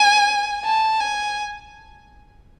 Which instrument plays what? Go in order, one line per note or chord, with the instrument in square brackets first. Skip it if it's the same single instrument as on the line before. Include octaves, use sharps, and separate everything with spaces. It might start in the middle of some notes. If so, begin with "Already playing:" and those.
Already playing: [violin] G#5
A5
G#5